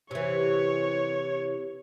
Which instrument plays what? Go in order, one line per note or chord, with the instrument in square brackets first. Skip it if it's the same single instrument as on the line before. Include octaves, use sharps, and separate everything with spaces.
[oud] C3 E3 [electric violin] C#5